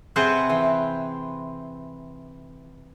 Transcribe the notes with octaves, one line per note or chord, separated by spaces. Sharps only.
C3 C4 G#4 B4 C5 F#5
E3